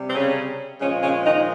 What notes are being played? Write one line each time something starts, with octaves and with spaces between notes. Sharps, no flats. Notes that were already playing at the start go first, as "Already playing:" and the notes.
Already playing: C3 G3
C4
C#3 C#4
A#2 C#3 F3 G#3 C#4
C#3 C#4
D#3 D#4